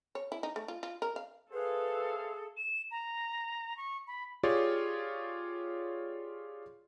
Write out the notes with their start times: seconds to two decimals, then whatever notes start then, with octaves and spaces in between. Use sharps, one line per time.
0.15 C#5
0.32 E4
0.43 D#4
0.56 A3
0.68 F4
0.83 F4
1.02 A#4
1.16 F5
1.53 G#4 A4 B4 C5 E5 F5
2.57 E7
2.91 A#5
3.77 C#6
4.07 B5
4.43 F4 G4 G#4 C#5 D5